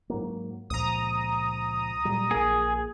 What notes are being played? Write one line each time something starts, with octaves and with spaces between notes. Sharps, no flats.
G#2 F#3 A#3
C#2 A#2 F3 A#5 D#6
A#2 F#3 G3
A#1 A#3 G#4